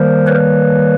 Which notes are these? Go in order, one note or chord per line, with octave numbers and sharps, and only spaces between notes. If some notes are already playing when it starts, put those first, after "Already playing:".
Already playing: D#3 G3 A#3 A#4 C5
B4 C#5